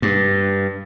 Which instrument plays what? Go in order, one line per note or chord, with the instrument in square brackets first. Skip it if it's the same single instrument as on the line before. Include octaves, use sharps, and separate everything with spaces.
[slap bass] G2